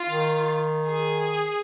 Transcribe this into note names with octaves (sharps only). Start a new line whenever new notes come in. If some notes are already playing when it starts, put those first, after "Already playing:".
Already playing: F4
D#3
G#4